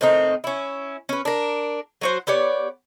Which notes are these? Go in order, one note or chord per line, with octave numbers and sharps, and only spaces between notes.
A2 D#3 C4 D#4
C#4 E4
C#4 B4
D4 A#4
F#3 F#4 C5
B3 G4 C#5 D5